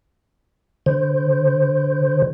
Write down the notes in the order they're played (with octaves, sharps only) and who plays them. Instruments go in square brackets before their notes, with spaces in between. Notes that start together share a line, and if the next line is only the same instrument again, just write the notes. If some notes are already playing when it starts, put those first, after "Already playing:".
[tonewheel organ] D3 C5